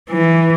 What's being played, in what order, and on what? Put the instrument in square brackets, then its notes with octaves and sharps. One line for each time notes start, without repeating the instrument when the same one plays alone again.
[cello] E3